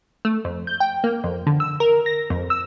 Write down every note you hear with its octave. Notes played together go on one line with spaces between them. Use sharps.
A3
F2
G6
G5
A#3
F2
D3
E6
A#4
A#6
F2
E6